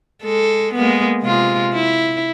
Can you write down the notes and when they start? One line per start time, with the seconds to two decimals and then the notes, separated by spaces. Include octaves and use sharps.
0.24 G#3 A4
0.75 G#3 A#3 B3
1.22 C3 G#3 F4
1.74 E4